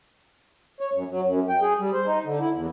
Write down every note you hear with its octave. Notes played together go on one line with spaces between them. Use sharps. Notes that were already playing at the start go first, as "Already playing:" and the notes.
C#5
F#2
F#3
F#2
G5
G#4
G3
C5
D#4
D3
E4
E2